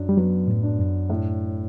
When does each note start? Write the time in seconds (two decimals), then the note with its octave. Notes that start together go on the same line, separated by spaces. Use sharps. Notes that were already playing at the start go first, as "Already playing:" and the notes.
Already playing: F#2 D4
0.09 G3
0.17 F#3 B3
0.48 A2
0.63 D4
0.79 F#2
1.10 A2